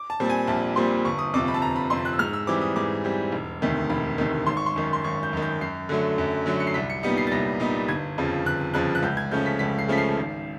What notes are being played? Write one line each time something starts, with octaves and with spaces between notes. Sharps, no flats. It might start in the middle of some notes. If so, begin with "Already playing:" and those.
Already playing: D6
A5
A#2 G3 C4 A5
G#5
A#1 A5
A#2 G3 C4 C6
G1 C#6
D#6
F2 C3 D6
B5
A5
G1 A#5
B5
F2 C3 C6
F#6
E6
G#2 F6
E6
E3 G3 C4 D6
D#6
G#2 D6
E3 G3 C4
E1
D2 C3 D#3
E1 B5
D2 C3 D#3
G#1 C6
C#6
C6
F#2 D#3
C6
G#1 C#6
G6
F#2 D#3
G6
F#2 C7
D3 F#3 A3
F#2
D3 F#3 A3
C#7
C7
C2 B6
C#7
A#2 G3 B3 D#4 C#7
C7
A6
C2 A#6
A#2 G3 B3 D#4
G1 G#6
F2 C#3 F3
G1 F#6
F2 C#3 F3 F#6
F#6
C#2 G6
G#6
C#3 F3 A3 C#4 G6
B6
C#2 B6
C7
C#3 F3 A3 C#4 B6
C7
G#1